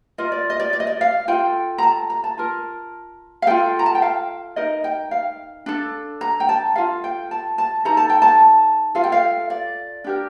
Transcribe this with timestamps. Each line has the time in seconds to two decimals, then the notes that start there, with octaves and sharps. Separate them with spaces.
0.18 F4 A#4 D#5
0.32 D5
0.50 D#5
0.60 D5
0.73 D5
0.80 D#5
0.87 D5
1.01 F5
1.28 F4 A4 G5
1.78 A#5
1.83 A5
2.10 A#5
2.24 A5
2.38 F4 A#4
3.42 F5
3.47 F4 A4 G5
3.79 A#5
3.86 A5
3.95 G5
4.02 F5
4.56 D#4 A#4 D#5
4.84 G5
5.11 F5
5.66 D4 A4
6.21 A#5
6.40 G5
6.49 A5
6.76 F4 A4 F5
7.04 G5
7.31 A5
7.58 A5
7.85 D#4 A4 A#5
7.97 A5
8.10 G5
8.22 A5
8.95 F4 A4 F5
9.04 G5
9.12 F5
9.50 D5
10.04 D4 G4 A#4